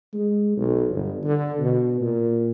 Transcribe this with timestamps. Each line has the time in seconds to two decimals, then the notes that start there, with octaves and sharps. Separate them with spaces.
0.13 G#3
0.57 B1
0.90 G1
1.24 D3
1.60 B2
2.01 A#2